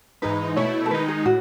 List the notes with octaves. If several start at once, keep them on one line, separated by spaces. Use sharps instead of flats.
G#2 E3 G#3 D#4 B4
B2 A3 E4 C#5
A4
D#3 G#3 D#4 B4
G#4
A2 F#4